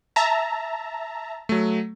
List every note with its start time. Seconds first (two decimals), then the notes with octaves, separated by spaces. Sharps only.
0.16 E5 A5 A#5
1.49 F#3 A3